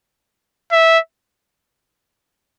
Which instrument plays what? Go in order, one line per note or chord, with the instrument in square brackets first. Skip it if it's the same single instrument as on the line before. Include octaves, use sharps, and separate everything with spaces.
[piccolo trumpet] E5